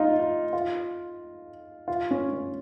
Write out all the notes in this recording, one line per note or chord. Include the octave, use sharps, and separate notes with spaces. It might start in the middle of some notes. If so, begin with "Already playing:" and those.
Already playing: D#4 F4
F4
F4
F4
C#4
C#4